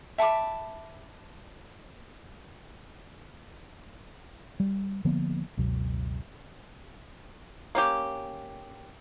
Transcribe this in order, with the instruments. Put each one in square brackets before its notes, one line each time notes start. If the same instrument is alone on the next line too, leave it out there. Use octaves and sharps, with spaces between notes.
[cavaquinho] E5 A5 B5 D6
[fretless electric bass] G3
D3 F3 A#3 B3
F#1 C#2 B2 F#3
[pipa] A#3 C#4 G4